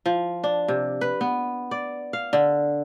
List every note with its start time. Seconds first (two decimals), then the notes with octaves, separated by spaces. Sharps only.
0.06 F3
0.44 D4
0.68 C3
1.01 B4
1.21 B3
1.71 D5
2.13 F5
2.33 D3